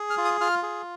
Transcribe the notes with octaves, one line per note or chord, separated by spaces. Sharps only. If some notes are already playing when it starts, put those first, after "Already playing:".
Already playing: G#4
F6
F4
D#6
F4 F6
G#4